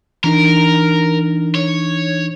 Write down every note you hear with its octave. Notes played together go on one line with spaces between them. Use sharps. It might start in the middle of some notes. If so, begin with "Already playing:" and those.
E3 D4 D#4 A#4
C#5